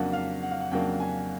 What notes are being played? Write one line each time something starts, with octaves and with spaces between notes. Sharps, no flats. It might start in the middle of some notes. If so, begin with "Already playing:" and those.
Already playing: F2 C#3 F#3 A#3 D4 F#5
F5
F#5
F5
F#5
F2 C#3 F#3 A#3 D4 G5
G#5